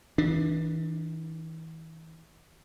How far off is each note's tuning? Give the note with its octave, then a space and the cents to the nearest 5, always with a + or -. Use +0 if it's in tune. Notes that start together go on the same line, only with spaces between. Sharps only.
E3 -35 D4 +10